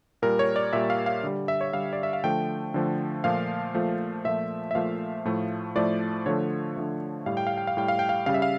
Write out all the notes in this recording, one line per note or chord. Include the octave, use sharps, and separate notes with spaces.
A#2 G3 A#4
C#5
D5
A#2 G3 E5
F5
F5
D3 G3
E5
C#5
D3 G3 F5
D5
E5
F5
D3 F3 A3 G5
D3 F3 A3
A#2 F3 A3 F5
A#2 F3 A3
A#2 F3 A3 E5
E5
A#2 F3 A3 F5
A2 F3 A3
A2 F3 A3 D5
D3 F3 A3 C#5
D3 F3 A3
A2 G3 F5
G5
F5
G5
F5
A2 G3 G5
F5
G5
F5
C#3 G3 F5
E5
F5